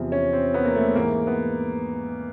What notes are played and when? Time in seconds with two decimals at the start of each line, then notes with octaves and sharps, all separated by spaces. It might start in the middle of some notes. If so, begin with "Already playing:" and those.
Already playing: E2 C3 F3
0.12 C#4
0.33 C4
0.54 B3
0.65 A#3
0.75 A3
0.95 G#2 E3 A#3
1.27 B3